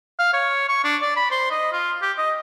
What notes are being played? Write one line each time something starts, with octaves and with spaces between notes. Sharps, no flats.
F5
C#5
C#6
D4
D5
B5
C5
D#5
F4
G4
D#5